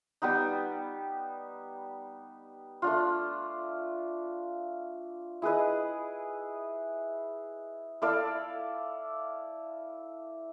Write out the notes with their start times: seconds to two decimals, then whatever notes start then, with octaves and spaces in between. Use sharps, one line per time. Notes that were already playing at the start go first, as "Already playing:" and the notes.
0.22 G3 B3 D#4
2.82 A3 D4 F4
5.42 E4 G#4 B4 D#5
8.02 E4 A4 D5 F5